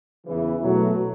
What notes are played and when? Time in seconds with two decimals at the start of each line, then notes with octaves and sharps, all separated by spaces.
0.26 E2 C#3 E3
0.63 B2 F#3 A3